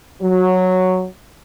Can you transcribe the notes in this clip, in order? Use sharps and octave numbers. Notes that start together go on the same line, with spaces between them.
F#3